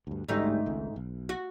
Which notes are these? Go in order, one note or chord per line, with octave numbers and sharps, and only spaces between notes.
D2 G2
A1 D2 G#2 G3 A3 D#4
G#1 C#2
B1
F#4